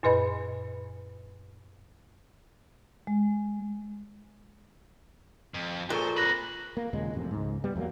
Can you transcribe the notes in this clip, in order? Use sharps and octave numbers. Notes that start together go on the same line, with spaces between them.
F#2 A#2 B4 D#5 B5
G#3
F2
A#2 G#4 A4 C5 C#6
C4 B4 F#6 A#6 F#7
A#3
D#2 A#2 C#3 G#3
A1 F2 C3
C#2 G#2
G3 B3
E2 G2 F#3 A#3